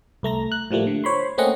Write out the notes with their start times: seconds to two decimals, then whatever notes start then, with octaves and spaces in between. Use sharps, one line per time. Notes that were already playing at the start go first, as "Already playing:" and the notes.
0.23 C2 A3 A#5 A#6
0.52 F#6
0.71 A2 F3 G3 A3 A#3
0.87 D3
1.04 C5 C#5 B5 C6
1.38 A3 A#3 C4 C#4 D#5 F#5